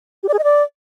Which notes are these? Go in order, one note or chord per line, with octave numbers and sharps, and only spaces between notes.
G4
D5
G#4
D#5
D5